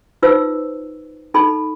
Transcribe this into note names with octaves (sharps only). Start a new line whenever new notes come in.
D#4 F4 B4 C5 E6
D#4 A4 B5